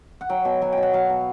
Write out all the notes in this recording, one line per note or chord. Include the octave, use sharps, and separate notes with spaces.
F#5
F#3 G5
B2
F#3 G#5
G5
B2
F#5
F#3 F5
B2